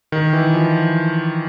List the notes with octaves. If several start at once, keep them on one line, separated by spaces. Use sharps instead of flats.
D#3
E3
F3